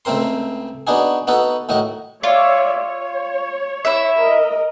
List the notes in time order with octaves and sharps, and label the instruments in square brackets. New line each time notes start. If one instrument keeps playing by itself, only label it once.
[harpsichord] C#2 A3 C4 A#4 C6
B3 D4 D#4 F#4 G#4
B3 D#4 F#4 A4 B4
A2 D#3 F#4 D#5
[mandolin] F4 [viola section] C#5 D5 E5
[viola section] C#5
[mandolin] E4 E5
[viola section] A#4 D#5